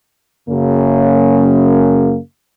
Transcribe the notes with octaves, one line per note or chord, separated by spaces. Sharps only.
F#2 C#3 A#3